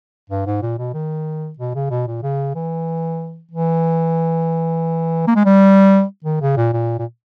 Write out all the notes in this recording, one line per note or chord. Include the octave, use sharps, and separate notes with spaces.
G2
G#2
A#2
B2
D#3
B2
C#3
B2
A#2
C#3
E3
E3
A#3
G#3
G3
D#3
C#3
A#2
A#2
A#2